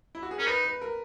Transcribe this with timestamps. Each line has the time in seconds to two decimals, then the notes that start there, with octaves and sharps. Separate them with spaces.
0.15 E4
0.23 F#4
0.31 G#4
0.39 C#4 A#4
0.47 D#4 B4
0.64 B4
0.81 A#4